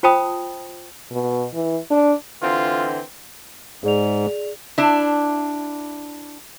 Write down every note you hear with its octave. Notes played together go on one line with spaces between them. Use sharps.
F4 C5 G5 A5 B5 D#6
B2
E3
D4
D3 E3 C4 F4
G#2 G#4 D5 F7
D4 E4